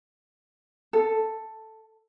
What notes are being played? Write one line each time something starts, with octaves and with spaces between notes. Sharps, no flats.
A4